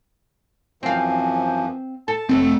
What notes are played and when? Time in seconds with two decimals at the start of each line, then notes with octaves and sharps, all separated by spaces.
0.83 F#2 E3 F3 C4 F5
2.08 A4 A5
2.29 F1 F#2 A3 C4